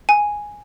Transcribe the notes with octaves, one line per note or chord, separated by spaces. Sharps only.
G#5